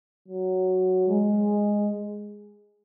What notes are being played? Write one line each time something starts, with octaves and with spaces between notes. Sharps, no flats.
F#3
G#3